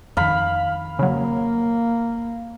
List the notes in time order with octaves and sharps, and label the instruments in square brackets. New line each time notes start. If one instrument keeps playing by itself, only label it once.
[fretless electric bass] F2 D#3 [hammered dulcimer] F5 B5
[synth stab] C#3 F#3 [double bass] A#3